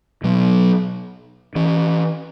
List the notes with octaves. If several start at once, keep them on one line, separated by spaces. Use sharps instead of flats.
B2 F#3 B3
E3 C#4